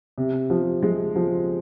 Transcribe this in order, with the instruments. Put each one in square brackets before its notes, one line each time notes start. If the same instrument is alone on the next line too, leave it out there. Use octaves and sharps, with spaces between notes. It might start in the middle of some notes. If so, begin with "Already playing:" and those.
[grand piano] C3
F3
G#3
F3